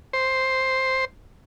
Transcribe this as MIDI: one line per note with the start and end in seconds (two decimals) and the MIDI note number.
0.13 1.05 72